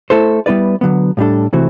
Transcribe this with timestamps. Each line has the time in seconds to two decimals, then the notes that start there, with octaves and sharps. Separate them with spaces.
0.10 A3 E4 A4 C5
0.46 G3 B3 E4 B4 D5
0.81 D3 F#3 B3
1.17 A2 G3 D4 A4
1.53 C3 E3 A3 C4 F#4